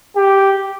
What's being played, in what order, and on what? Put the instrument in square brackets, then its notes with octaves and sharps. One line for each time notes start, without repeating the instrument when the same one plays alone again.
[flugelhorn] G4